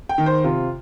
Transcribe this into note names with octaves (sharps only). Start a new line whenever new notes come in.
G5
D#3
C5
C3 F4